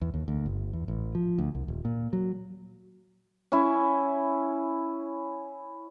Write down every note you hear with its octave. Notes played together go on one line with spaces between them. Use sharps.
E2
D#2
D2
G1
E2
A1
F3
D2
C2
D#1
A#2
F#3
C#4 E4